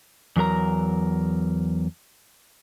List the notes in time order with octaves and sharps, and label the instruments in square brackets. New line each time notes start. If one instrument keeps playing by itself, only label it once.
[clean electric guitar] E2 F#3 A#4 A#5